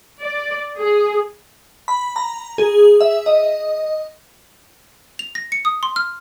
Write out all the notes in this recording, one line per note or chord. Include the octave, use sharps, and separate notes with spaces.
D5
G#4
B5
A#5
G#4
E5
D#5
F7
A#6
C#7
D#6
C6
F6